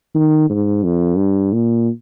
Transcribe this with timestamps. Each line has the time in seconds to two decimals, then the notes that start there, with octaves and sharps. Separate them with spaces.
0.15 D#3
0.49 G#2
0.83 F2
1.17 G2
1.53 A#2